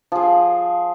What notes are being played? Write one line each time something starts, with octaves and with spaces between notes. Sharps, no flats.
F3 G#4